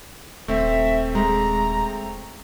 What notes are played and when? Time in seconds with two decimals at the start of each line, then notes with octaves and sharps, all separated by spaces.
0.48 D#1 A3 C4 E5
1.15 G#3 A#5